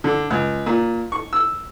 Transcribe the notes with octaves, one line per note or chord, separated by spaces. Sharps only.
D3
C#2
A#2
C#6
E6